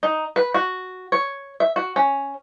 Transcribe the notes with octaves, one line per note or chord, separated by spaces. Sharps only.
D#4
B4
F#4
C#5
E5
F#4
C#4